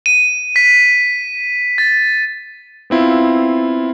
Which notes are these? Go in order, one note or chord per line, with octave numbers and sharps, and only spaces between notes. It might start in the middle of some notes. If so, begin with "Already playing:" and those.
D#7
B6
A6
B3 C4 E4 F4